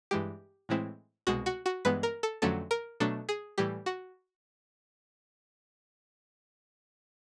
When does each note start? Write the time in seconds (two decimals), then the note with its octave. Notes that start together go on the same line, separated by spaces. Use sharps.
0.11 G2 E3 G#3 G4
0.69 A2 E3 G#3 C4 E4
1.27 C2 B2 G#3 F#4
1.46 F#4
1.66 F#4
1.85 G2 E3 G#3 B3 B4
2.03 A#4
2.23 A4
2.42 F2 D3 F#3 A3 C#4 A4
2.71 A#4
3.00 B2 F#3 A3 D4 A4
3.29 G#4
3.58 A2 E3 G3 G4
3.86 F#4